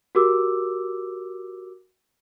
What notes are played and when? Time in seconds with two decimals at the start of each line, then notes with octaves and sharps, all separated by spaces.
0.15 F#4 G4 A#4 D6 E6